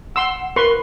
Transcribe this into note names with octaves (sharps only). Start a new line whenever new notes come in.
F#5 C6 E6
A#4 B4 C6 C#6